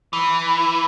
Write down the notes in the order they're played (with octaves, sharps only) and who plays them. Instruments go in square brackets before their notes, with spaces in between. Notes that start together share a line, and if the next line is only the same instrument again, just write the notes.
[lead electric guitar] E3